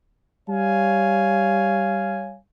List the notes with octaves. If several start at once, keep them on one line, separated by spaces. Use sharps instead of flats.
G3 C#5 F5 G#5